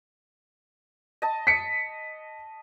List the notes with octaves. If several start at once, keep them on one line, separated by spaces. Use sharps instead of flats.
D#5 A5
B6 C#7